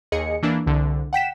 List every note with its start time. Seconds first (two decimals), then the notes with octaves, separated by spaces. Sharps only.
0.12 D#2 G#4 D#5 C#7
0.43 E3 A#3 D4
0.66 C2 D3
1.13 F#5 G5 B6 E7